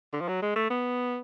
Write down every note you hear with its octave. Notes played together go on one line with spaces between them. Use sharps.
D3
F3
F#3
G#3
A3
B3